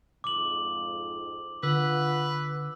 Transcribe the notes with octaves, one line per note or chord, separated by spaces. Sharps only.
F2 G#2 D6 F#7
D3 F4 B4 F#5 E6